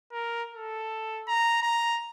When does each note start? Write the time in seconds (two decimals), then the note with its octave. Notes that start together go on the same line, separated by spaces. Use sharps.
0.12 A#4
0.55 A4
1.28 A#5
1.62 A#5